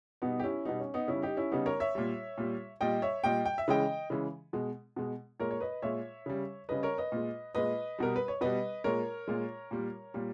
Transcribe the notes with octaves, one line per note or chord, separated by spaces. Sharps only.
B2 G3 B3 D#4
G4
C#4 E4
B2 G3 B3 D#4
C#4
B3 D#4
C#3 G3 C#4 E4
D#4 G4
C#4 E4
C#3 G3 B3 D#4
A#4 C#5
C#5 E5
A#2 G3
A#2 G3
A#2 G3 D#5 G5
C#5 E5
A#2 G3 D#5 G5
G5
E5
C#3 E3 G#3 D#5 G5
C#3 E3 G#3
B2 G#3
B2 G#3
A#2 G#3 A#4 C#5
C#5
B4 D#5
A#2 G#3 C#5 E5
C#3 G3
C#3 G3 B4 D#5
A#4 C#5
B4 D#5
A#2 G#3
A#2 G#3 B4 D#5
B2 G3 A#4
B4
C#5
B2 G3 B4 D#5
A#2 G#3 A#4 C#5
A#2 G#3
A#2 G3
A#2 G3